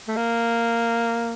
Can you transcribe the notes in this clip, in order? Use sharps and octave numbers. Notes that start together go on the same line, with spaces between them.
A3
A#3